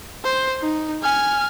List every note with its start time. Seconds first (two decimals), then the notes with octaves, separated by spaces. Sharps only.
0.24 C5
0.62 D#4
1.02 G#5 F6